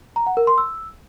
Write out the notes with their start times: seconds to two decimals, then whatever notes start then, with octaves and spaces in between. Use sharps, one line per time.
0.16 A#5
0.26 F#5
0.37 A#4
0.47 C6
0.58 E6